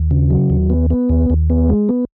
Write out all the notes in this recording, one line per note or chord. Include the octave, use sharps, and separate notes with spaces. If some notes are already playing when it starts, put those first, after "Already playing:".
Already playing: D#2
C#3
F#3
D#2
B3
B3
D#2
D#2
B3
G#3
B3